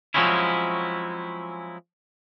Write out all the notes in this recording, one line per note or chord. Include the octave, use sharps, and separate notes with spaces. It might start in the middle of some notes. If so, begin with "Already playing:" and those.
F3 F#3 G#3 C4 C#4 E4